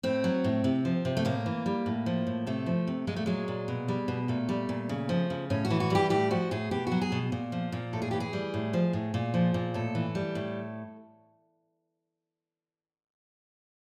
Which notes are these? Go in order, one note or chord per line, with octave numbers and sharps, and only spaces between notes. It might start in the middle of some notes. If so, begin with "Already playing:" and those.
A2 C4
F#3
A2
C3
F3
C3
A3
A2 A#3
E3
G3
A2
F3
A2
C3 A3
F3
C3
A#2 G#3
A3
F#3 G#3
A#2
B2
G3
B2
A#2 A3
G3
A#2
C#3
F3
C#3
A2 C#4
F#4
E3
F#4
G3 G4
A2 G4
F3 F#4
A2 G#4
B2 G4
F#3 F#4
G#4
B2
A#2
F3
A#2
A2 A4
G#4
E3 G4
G#4
G3
A2
F3
A2
A#2
F3
A#2
A2 A4
E3
G3
A2